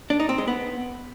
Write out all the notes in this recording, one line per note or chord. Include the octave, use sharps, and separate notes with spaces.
D4
D#4
C4
G#3
B3